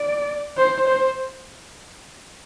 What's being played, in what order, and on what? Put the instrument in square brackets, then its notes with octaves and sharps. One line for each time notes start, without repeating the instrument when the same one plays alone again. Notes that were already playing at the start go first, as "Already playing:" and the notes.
Already playing: [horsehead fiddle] D5
C5
C5